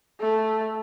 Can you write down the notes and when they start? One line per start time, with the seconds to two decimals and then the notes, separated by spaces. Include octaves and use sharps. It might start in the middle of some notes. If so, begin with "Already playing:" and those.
0.20 A3